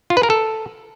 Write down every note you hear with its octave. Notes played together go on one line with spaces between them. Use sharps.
F4
B4
A#4
A4